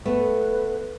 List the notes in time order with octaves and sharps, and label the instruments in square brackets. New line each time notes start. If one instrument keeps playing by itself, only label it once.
[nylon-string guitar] A3 B3 [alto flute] B4